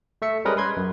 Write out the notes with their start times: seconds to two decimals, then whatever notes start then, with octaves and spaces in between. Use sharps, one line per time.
0.22 A3 E5 C#7
0.45 G3 G#3 C#4 A#4 B4 D#5
0.57 B4 C6 G#6
0.77 F#2